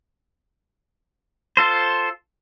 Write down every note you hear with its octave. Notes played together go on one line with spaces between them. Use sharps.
F4 A4 C5